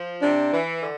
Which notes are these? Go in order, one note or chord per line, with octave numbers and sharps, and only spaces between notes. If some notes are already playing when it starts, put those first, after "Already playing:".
Already playing: F3
C3 D4
E3
D3